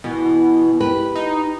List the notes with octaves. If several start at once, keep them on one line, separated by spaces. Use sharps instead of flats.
B2 E3
G4 B4
D#4